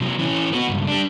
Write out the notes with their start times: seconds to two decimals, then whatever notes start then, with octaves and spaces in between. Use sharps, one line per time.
0.01 C3 F#3
0.18 E3 C#4
0.52 B3 F#4
0.68 C#2 G2
0.87 G3 D4